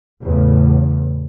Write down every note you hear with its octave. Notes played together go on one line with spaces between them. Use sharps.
E2 A2 C#3